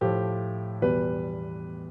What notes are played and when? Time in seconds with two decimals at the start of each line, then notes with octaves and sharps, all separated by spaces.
0.01 A2 F3 A3 G4
0.82 E2 B2 G3 B4